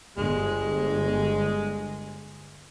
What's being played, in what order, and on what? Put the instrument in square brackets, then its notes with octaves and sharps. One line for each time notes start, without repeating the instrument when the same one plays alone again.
[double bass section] G1 [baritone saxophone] G#3